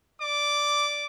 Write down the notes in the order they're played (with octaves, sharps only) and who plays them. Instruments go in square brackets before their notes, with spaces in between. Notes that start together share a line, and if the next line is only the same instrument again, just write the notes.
[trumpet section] D5 D6